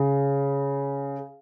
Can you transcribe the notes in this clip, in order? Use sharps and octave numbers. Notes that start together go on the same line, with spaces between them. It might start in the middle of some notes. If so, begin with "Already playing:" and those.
Already playing: C#3